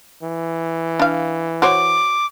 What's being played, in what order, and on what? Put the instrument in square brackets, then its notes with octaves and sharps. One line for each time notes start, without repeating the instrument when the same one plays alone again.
[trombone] E3
[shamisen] D4 F5
[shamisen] F#4 C5 C#5 [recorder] D6